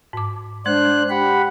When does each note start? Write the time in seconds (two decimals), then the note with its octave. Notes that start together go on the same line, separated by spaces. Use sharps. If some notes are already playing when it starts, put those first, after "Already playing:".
0.13 G#2 D6
0.66 G#3 D4 C5 F#6
1.10 G4 F#5 B5